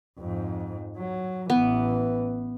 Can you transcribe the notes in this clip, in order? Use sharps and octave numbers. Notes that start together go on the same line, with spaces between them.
F2 G#2
F#3
A1 E3 B3